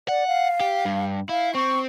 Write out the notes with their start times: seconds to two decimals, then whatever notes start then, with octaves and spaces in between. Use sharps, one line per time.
0.09 D5 F#5
0.27 F5
0.60 G4
0.85 G2
1.29 E4 F5
1.55 C4 C#6